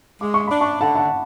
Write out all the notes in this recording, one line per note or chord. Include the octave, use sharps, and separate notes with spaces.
G#3 D6
C#6
D4 B5
A5 C#6
D3 F#5 A5
F#5 A5